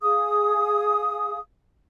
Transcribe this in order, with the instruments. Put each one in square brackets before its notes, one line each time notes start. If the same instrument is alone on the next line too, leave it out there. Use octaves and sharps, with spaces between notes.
[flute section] G#4 F5 D#6